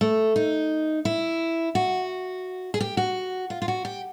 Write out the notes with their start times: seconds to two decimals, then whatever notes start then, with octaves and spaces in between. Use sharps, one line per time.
0.01 A3
0.36 D#4
1.05 E4
1.75 F#4
2.74 G#4
2.80 G4
2.97 F#4
3.50 F4
3.62 F4
3.68 F#4
3.85 G4